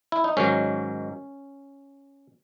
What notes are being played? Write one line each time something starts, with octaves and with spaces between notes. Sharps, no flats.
E4
D#4
G#2 D#3 F#3 C#4